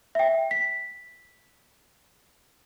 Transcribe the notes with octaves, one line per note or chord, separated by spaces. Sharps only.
E5 G5
B6